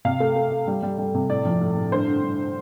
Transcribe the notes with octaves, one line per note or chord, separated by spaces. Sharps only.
C3 F5
A3
A3
A3
G3
G3
G3
C3
A2 D5
F3
A2
A2
G2 C5
D3
G2